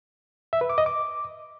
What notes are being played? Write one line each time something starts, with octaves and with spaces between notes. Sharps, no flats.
E5
B4
D6
D#5
D6